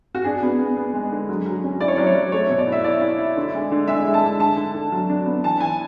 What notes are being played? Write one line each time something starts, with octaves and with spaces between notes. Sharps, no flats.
F#4
D4 G#4
B3
B3
B3
G#3
D3
F#3
F#3
C#4
E4 D5
C#5
F#3 D5
C#5
F#3
A3 C#5
B2
D5
E4
E5
E4 D5
E4
E4
D3
G#3
D3
G#3 E5
G#3
A5
D3
D3 A5
D3
D3
F#3
D4
B3
E3 A5
E3 G#5